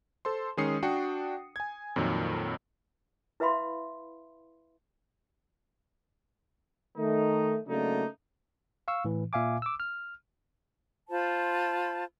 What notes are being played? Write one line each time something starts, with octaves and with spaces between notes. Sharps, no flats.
A4 C5 C6
D#3 G#3 C#4 D#6 C7 C#7
D4 F#4 F#5 G5 C#7
G#5 G#6
F2 A#2 D#3 F#3
E4 B4 E5 F5 B5 C6
D#3 A3 D#4
C#3 F#3 A3 A#3 D4 D#4
F5 C#6 E6
A2 E3
A#2 E5 F5 G#5 D6
D6 E6
F6
F4 C5 A5 B5